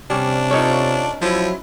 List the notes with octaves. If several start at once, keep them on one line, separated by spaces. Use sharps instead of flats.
C3 G3 C#4 D4
C#4 D#4 F4 A4 C#5
F3 F#3 E4